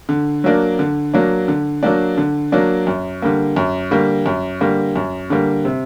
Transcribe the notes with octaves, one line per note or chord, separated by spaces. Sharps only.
D3
F#3 A#3 D4
D3
F#3 A#3 D4
D3
F#3 A#3 D4
D3
F#3 A#3 D4
F#2
D3 G3 A#3
F#2
D3 G3 A#3
F#2
D3 G3 A#3
F#2
D3 G3 A#3
C3